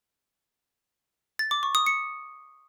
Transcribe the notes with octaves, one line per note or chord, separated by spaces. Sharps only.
A6
D6
C#6
D#6
C#7